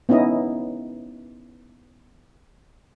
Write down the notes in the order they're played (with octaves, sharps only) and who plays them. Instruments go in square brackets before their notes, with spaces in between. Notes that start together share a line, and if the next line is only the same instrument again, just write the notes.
[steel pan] B3 C#4 D#4 E4 D#5